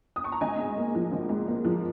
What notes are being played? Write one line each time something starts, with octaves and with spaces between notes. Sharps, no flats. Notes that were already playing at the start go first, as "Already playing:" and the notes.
D#6
C#6
A#5
G#1 D#5 G#5
G#2
A#3
F3
G#1
G#2
A#3
F3